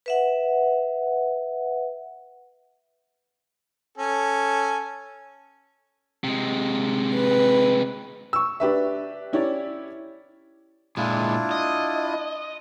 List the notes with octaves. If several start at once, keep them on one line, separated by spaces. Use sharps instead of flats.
B4 E5 F#5
C#4 A4 G#5
C3 G#3
B4
C#6 E6
D4 G4 B4 E5
C#4 E4 G4 C#5 D5
A#2 G#3 D4 E4 F4
D#5